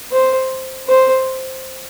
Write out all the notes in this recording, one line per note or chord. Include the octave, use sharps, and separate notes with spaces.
C5
C5